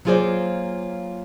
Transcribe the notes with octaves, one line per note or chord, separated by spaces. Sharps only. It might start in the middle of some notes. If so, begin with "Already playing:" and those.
F#3 A#3 F4 G#4 C5 D5